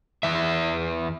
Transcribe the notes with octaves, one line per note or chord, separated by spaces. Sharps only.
E2 E3 E5